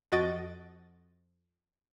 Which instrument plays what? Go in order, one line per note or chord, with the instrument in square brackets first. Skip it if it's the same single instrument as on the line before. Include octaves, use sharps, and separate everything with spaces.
[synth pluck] F2 F#4 D#5 A6 D7